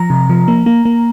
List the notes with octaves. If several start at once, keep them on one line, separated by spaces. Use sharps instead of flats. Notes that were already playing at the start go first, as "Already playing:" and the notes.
Already playing: F3 A#5
C3
F3
A#3
A#3
A#3